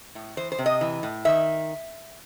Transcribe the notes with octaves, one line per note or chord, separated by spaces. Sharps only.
A2
E3 C5
C5
C3
D#5
E3
A2
D#3 E5